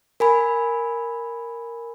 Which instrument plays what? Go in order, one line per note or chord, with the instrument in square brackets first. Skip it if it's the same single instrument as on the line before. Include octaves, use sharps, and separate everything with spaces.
[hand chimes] A#4 G#5 B5